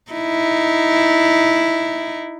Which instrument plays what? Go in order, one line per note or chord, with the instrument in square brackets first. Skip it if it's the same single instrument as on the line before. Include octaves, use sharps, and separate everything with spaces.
[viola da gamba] D#4 E4